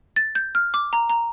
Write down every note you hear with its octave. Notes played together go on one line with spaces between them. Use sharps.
A6
G6
F6
D6
A#5
A#5